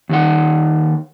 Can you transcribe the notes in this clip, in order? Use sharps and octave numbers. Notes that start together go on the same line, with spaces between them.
D#2 D#3 F#5